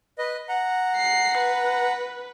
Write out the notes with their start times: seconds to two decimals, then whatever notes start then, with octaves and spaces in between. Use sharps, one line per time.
0.18 B4 D#5
0.49 F#5 A#5
0.97 C7
1.38 B4